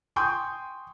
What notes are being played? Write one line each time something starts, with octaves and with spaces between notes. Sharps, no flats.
G5 G#5 C6 C#6 D#6 G6